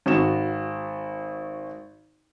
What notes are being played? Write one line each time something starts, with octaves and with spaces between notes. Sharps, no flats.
G#1 F#4 E7